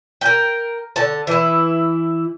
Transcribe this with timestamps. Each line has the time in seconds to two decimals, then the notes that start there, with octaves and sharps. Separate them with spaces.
0.21 A#4 G5
0.96 D3 A5
1.27 E3 E4